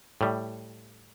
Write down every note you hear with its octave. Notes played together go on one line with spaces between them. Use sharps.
A2 G3